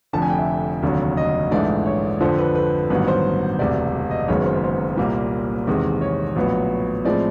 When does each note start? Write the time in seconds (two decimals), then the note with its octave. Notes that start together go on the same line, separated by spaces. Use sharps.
0.13 F1 F2 D3 A5
0.22 G#5
0.30 G5
0.38 E5
0.83 F1 D#2 D3 F#3
1.17 D#5
1.51 A#1 G#2 E3 A3 D4 D5
1.86 C#5
2.21 F2 D3 F3 C5
2.38 B4
2.55 B4
2.90 A1 G2 D#3 F#3 B3 B4
3.08 C5
3.59 E1 D2 C3 D5
4.11 D#5
4.28 F#1 F#2 D#3 G#3 B3 C#5
4.46 C5
4.64 C5
4.97 C2 A#2 G3 A#3
5.67 E2 C3 D#3 G#3
6.01 C#5
6.36 A#1 A2 F#3 B3
7.05 A2 F3 G#3 C4 D5